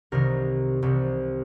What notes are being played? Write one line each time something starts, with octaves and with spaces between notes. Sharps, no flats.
C2 C3 D#3 A#4
C2 C3 D#3